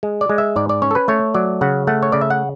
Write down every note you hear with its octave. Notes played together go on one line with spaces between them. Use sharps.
G#3
D5
G#3
E5
G#2 D5
D5
C#4 C#5
A4
B4
A3 C#5
F#3 D5
C#3 F#5
A3 F#5
C#5
C#3 D5
E5
F#5